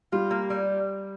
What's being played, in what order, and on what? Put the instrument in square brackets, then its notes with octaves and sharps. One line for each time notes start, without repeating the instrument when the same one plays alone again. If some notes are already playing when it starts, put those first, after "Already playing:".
[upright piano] G3 [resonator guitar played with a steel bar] F4
[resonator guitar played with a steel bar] A#3
G3